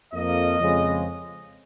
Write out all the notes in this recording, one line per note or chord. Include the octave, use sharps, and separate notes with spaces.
F2 F3 A#3 D#5
F2 C#3 G#3